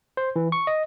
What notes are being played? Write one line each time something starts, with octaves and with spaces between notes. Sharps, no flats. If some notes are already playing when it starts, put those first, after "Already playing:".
C5
E3
C#6
D#5